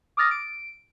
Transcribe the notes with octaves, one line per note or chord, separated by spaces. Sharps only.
D6 D#6 F6 A6 A#6
D7